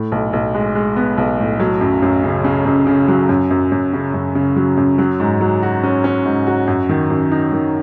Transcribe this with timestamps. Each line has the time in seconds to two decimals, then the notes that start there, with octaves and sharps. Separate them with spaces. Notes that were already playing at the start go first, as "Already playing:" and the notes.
Already playing: A2
0.12 B1
0.33 B1
0.54 G#3
0.75 G#3
0.96 B3
1.17 B1
1.39 A2
1.60 F#3
1.81 F#2
2.02 F#2
2.24 C#3
2.44 C#3
2.66 F#2
2.87 C#3
3.08 F#3
3.29 F#2
3.50 F#2
3.72 F#2
3.93 C#3
4.14 F#2
4.35 C#3
4.56 F#3
4.77 F#2
4.98 F#3
5.20 G#2
5.41 F#3
5.63 F#4
5.84 C#4
6.04 C#4
6.25 G#2
6.47 F#4
6.67 F#2
6.89 D#3
7.10 F#2
7.32 D#4
7.53 D#3